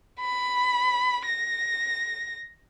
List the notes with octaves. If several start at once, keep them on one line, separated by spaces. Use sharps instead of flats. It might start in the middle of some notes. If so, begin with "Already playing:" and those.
B5
A#6